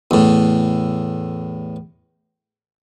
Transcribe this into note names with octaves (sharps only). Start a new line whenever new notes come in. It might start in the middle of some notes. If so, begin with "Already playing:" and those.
E2 A2